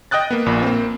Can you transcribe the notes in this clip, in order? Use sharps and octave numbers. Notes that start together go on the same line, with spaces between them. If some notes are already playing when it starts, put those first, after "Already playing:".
D#5 G5 D#6 F#6 A6
A#3 B3
A#1 A#2 B5
A#3 C4